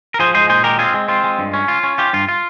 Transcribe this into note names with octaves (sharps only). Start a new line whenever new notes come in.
A#4
F3 G#4 C5
G#3 G#4 C5
A#2 G#4 C5
G#3 G4 A#4
C4 F4 G#4
G#3
C4 F4
G#3
G2
C#4
F4
C#4
F4 G4
G2 F4
F4